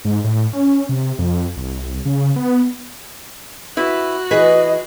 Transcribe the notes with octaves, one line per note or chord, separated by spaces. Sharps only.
G#2
A2
C#4
C3
F2
C2
C#3
B3
E4 F#4 B4
E3 G#4 B4 D#5